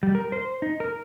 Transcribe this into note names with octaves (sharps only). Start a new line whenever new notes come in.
G3
A#4
C5
D#4
A#4